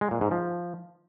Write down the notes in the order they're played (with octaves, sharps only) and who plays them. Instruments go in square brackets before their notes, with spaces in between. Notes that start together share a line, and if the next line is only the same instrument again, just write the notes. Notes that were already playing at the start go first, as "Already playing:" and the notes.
[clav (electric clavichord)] G#3
A#2
G#2
F3